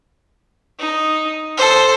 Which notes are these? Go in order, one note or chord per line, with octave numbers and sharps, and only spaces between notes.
D#4
A4 C5